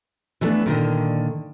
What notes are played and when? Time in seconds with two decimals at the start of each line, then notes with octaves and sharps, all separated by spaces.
0.41 E3 G3 A3 B3 D4
0.66 A#2 D3 D#3